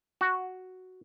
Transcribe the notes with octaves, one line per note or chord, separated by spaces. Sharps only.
F#4